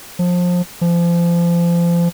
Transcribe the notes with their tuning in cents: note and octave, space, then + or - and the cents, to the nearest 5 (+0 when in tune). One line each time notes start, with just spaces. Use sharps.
F3 +25
F3 -30